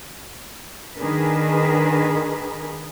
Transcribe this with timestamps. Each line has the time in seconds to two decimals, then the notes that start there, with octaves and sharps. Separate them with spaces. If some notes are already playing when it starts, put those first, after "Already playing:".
0.98 D#3 D4 G#4 A#4 B4